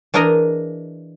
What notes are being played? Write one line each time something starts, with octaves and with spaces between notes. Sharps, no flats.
E3 D4 G#4 A#4 D#5 A#5